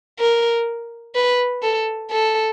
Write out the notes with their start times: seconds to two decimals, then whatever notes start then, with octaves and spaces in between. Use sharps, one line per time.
0.19 A#4
1.15 B4
1.63 A4
2.11 A4